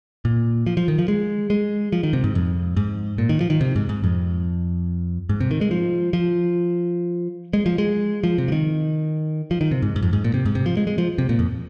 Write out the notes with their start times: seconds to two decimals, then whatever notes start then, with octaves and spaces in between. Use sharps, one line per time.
0.25 A#2
0.66 F3
0.77 F3
0.88 D#3
0.99 F3
1.08 G#3
1.50 G#3
1.92 F3
2.03 D#3
2.13 C3
2.24 G#2
2.35 F2
2.77 G#2
3.18 A#2
3.29 D#3
3.41 F3
3.50 D#3
3.61 C3
3.76 G#2
3.89 G#2
4.04 F2
5.29 G#2
5.40 C3
5.51 D#3
5.61 G#3
5.71 F3
6.13 F3
7.53 G#3
7.66 F3
7.78 G#3
8.24 F3
8.38 C3
8.48 F3
8.52 D#3
9.51 F3
9.61 D#3
9.71 C3
9.82 G#2
9.96 G#2
10.02 F2
10.13 G#2
10.24 A#2
10.34 C3
10.46 G#2
10.55 C3
10.66 F3
10.77 G#3
10.87 G#3
10.98 F3
11.18 C3
11.29 A#2
11.39 F2